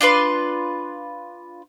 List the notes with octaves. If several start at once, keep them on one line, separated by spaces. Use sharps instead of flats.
D4 F4 B4 C6